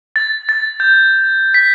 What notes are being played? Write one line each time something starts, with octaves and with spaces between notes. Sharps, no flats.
A6
A6
G6
B6